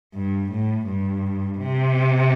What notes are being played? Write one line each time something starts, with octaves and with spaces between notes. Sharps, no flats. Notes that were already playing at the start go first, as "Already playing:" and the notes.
G2
A2
G2
C3